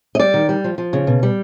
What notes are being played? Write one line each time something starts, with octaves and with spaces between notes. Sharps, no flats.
D#5
G3 D5
D#3
G3
F3
F3
C#3
B2
G3